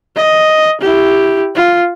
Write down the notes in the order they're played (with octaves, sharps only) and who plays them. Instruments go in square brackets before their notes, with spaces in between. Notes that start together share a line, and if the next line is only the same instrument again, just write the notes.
[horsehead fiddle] D#5
E4 G4
F4